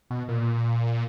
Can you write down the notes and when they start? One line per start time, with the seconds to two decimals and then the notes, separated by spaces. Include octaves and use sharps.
0.11 B2
0.29 A#2